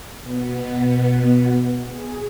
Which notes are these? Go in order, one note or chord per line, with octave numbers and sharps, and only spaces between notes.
B2 B3
G#4